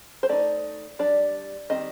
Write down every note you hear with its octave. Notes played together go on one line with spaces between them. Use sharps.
C5
A3 D#4 D5
G3 D4 D5
D#3 G3 C4 D#5